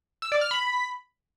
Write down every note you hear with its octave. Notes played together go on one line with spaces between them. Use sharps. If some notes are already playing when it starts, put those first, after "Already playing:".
E6
D5
F6
B5